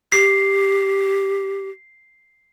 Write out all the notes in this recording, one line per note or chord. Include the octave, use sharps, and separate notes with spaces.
G4 C7